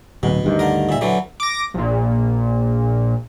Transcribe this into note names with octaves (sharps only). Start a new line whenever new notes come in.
D1 B2
D2 G2 D#3
D3 A#4
A#2 E5
D3 E3 F#3
D6 A#6
A#1 A#2